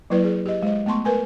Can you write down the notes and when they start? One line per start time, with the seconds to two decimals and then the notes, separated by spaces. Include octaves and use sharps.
0.10 F#3 A#3 E4 B4 D5
0.24 G#4
0.46 G4 D#5
0.62 G#3 C5 D#5
0.86 A3 B3 A5 C6 C#6
1.05 A#4 B4 G#5